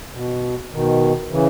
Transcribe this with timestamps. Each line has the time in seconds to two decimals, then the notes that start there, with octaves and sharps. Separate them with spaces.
0.14 B2
0.72 B2 D#3
1.30 C#3 E3